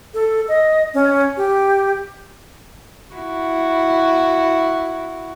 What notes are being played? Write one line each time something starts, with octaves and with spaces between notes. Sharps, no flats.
A4
D#5
C#4
G4
E4 F#4